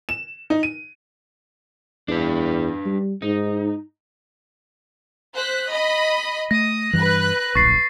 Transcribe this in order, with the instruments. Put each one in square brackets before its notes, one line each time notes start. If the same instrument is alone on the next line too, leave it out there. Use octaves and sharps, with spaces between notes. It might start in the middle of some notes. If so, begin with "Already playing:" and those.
[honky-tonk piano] E7
D#4
D#7
[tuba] E2 [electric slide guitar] D4 B4
[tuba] G3
[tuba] G#2 [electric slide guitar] D#4
[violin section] C5 F#6 B6
D#5 B5
[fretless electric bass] A3 [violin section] D#6 [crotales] A#6
[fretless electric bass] G2 E3 [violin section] B4 F#6
[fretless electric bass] D1 A#1 [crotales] C#6 A6 C7